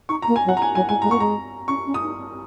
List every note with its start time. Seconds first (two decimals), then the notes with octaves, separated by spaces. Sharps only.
0.09 D#4 C#6
0.22 A#5
0.27 A#3
0.36 G#5
0.44 F#3
0.49 F#5
0.57 A#5
0.62 G#5
0.75 F#3 G#5
0.89 G#3 G#5
1.02 G#3 A#5
1.10 A#3 C#6
1.19 G#3 A#5
1.68 C#4 C#6
1.86 C#4
1.94 D#6
2.03 D#4